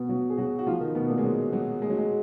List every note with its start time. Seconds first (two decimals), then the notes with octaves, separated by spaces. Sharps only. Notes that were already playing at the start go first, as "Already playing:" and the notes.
Already playing: B2 B3
0.09 F#3 F#4
0.30 G#4
0.38 F#3 F#4
0.59 F#4
0.67 F3 F4
0.80 D#3 D#4
0.95 B2 B3
1.10 A#2 A#3
1.18 G#3
1.24 F#3
1.53 F#3
1.82 G#3
1.90 F#3
1.98 G#3